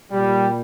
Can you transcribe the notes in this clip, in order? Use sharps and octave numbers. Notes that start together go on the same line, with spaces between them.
A#2 G3